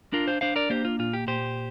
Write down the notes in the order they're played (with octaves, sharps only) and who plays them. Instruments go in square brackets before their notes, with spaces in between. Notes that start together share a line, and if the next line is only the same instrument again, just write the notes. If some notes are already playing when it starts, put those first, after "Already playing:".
[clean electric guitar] D4 F4 A#4
C5 F5
D4 C5 F5
A#4 D5
A#3 G4 C5
F4
A#2 F4
G4
A#2 G4 C5